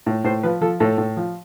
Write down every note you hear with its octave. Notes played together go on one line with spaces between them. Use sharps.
A2
A2 C5
F3 B4
F3 A4
A2 A4
A2
F3